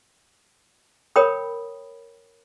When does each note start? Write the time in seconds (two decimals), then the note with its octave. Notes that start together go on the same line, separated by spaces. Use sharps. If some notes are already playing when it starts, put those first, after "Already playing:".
1.16 A#4 C#5 G5 B5 D#6